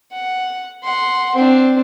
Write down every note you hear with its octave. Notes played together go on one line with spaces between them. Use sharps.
F#5
F#5 C6
C4 D4